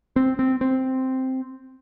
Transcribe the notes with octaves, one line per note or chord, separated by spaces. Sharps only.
C4
C4
C4